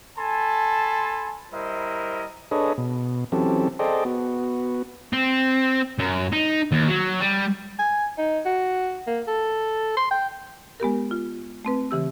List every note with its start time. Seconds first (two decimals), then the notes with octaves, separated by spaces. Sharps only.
0.18 A4 G#5 A5 B5 C6
1.52 G3 E4 A#4 C5 D#5
2.51 D4 G#4 A4 B4 C#5 D#5
2.78 B2
3.32 E3 F#3 C4 C#4 G4 A4
3.79 G#4 A4 C5 D5 D#5 G5
4.05 B3 F#4
5.13 C4
5.99 F#2
6.33 D#4
6.72 D#2
6.88 F#3
7.21 G3
7.79 G#5
8.18 D#4
8.45 F#4
9.07 A#3
9.27 A4
9.97 C6
10.11 G5
10.80 G#3 B3 G4 A#4
11.11 F4
11.65 A3 C4 B4
11.91 C#3 E3 G4 E6